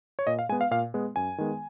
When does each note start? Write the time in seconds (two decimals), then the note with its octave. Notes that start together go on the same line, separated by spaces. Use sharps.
0.19 C#5
0.27 A#2 D#5
0.39 F5
0.49 G#3 G#5
0.52 B3
0.61 F5
0.71 A#2 F5
0.94 G#3 B3
1.16 F#2 G#5
1.38 D#3 G#3 B3